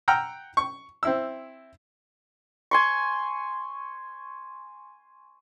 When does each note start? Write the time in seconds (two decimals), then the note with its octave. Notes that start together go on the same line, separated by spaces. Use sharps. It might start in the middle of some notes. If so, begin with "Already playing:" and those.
0.08 F#5 G5 A#5 E6 F6
0.57 C#6
1.03 C4 E4 E6
2.71 G#5 C6 C#6